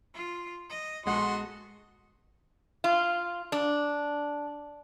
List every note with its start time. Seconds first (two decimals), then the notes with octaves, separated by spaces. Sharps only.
0.14 F4
0.70 D#5
1.06 A#1 G#3 B3 F#4 A4 D#5 F#5 C6
2.84 F4
3.52 D4